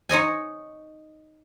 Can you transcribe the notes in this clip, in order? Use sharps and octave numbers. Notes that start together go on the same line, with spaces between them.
D#4 C#5 D#5 G#5